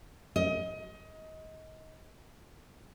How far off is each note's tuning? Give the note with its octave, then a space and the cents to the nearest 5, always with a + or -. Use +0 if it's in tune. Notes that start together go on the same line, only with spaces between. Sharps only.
D#5 +25